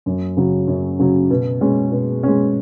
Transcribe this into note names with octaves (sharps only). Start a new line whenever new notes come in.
F#2
C#3 F#3
F#2
C#3 F#3
B2
G#3 C#4
B2
G#3 C#4